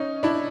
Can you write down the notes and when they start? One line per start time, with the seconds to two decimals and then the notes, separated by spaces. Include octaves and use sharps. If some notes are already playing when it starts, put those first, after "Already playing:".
Already playing: C#4 D#4
0.23 D4 E4